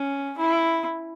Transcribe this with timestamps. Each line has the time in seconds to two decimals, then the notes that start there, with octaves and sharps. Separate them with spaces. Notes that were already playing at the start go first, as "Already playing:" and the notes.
Already playing: C#4
0.38 E4